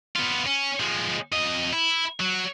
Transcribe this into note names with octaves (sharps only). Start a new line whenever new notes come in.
B3 F4
C#4
F3 G#3
F2 D#5
E4
F#3